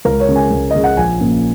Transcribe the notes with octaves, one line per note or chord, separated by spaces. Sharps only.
C#2 A#4
C#5
C#3 G#3 C#4
G#5
C#2
C#3 G#3 C#4 D#5
F#5
A#1 G#5
A#2 A#3 C#4